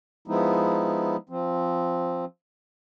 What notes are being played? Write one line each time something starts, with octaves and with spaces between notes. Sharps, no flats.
F3 G#3 B3 D#4 E4
F3 C4